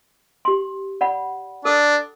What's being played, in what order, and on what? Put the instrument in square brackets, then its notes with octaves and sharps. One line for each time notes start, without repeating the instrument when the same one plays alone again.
[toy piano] G4 C6
D5 F#5 B5
[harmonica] D4 [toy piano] A4